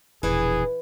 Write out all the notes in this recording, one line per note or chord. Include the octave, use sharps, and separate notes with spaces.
E1 A#1 E3 G#4